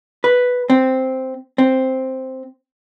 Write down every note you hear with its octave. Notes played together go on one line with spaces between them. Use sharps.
B4
C4
C4